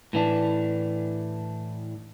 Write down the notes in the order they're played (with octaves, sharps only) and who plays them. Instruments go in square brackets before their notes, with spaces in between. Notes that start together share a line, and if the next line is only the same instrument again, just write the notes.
[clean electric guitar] A2 E3 D4